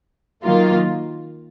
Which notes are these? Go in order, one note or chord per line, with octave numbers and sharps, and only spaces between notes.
D#3 F#3 A#3 F4